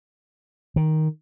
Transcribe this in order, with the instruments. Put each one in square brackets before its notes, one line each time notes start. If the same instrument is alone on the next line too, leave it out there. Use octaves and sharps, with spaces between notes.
[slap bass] D#3